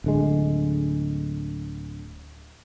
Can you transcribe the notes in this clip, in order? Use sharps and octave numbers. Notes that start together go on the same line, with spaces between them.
D1 D3 G#3